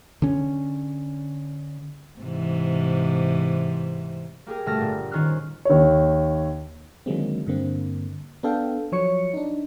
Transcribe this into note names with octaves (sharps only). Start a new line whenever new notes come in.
D3 C#4
G#2 C3 E3
A#3 G4 G#4 A#4
G1 B2 A3 A5 F6 A#6
A#2
D#3 C#4 C5 F6 F#6
D#2 C#5
D3 D#3 F#3 G#3 A#3 C4
G2 D3 A#3 C4
B3 D4 A4 F5 G5
F3 F#3 C#5 C#6 C#7
D4 D#4